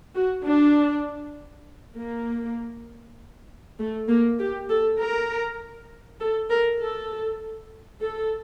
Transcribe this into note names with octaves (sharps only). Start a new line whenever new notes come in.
F#4
D4
A#3
A3
A#3
G4
A4
A#4
A4
A#4
A4
A4